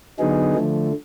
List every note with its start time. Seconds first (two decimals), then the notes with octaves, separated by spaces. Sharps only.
0.19 D3 F#3 B3 D#4 G#4
0.55 D3 F3 A3